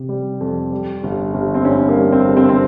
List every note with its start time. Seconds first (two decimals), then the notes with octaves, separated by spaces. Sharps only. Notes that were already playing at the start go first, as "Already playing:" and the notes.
Already playing: C3
0.09 G3
0.41 F2
0.72 G3
1.03 G1
1.34 G1
1.55 C4
1.65 G2 C#4
1.89 A#3
1.97 G3
2.12 C4
2.28 G1
2.37 C4
2.49 C4